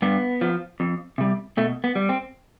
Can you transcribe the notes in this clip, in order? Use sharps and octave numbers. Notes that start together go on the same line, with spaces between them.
G2 B3
F3
F2
C3 G3
B2 A3
B3
G3
C4